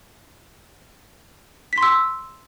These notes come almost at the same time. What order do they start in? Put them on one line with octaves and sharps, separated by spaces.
B6 C6 E6